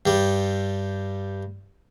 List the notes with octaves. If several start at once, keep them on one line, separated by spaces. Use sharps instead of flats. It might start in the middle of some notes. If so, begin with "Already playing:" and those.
G2 G3